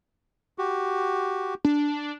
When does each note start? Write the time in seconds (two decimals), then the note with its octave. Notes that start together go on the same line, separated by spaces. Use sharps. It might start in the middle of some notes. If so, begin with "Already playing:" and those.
0.58 F#4 G4
1.65 D4